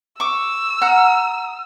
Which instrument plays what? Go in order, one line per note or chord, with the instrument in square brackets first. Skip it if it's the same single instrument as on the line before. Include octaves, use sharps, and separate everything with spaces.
[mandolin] C#6 D6 [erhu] E6
[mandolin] F#5 A#5 F6